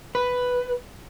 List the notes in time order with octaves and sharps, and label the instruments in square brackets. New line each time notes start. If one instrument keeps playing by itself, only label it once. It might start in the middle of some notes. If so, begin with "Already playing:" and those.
[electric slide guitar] B4